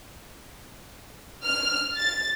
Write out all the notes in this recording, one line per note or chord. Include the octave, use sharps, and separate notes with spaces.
F6
A6